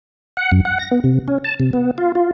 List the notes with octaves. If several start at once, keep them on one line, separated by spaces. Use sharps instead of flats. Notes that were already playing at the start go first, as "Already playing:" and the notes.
F#5
F#2
F#5
A#6
B3
C3
C#4
A5
C3
B3
F4
F4